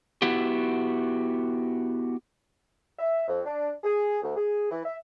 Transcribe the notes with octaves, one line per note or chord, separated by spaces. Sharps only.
B3 E4 F#4 G4
E5
F2
D4
G#4
D2
G#4
E3
E5